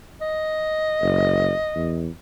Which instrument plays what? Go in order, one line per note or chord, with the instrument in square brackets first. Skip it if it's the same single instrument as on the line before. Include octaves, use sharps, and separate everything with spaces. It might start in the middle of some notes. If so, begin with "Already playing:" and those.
[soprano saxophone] D#5
[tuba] F#1
E2